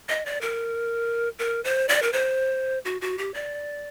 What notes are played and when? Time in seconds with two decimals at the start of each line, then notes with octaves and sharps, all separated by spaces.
0.09 D#5
0.26 D5
0.41 A#4
1.39 A#4
1.64 C5
1.89 D5
2.02 A#4
2.13 C5
2.85 F#4
3.01 F#4
3.18 G4
3.34 D5